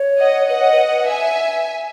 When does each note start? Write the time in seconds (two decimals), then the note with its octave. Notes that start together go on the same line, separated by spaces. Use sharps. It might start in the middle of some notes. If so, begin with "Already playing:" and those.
Already playing: C#5
0.20 D#5 F#5
0.48 B4 D#5 F#5
0.61 C#5
0.72 B4
1.07 E5 G#5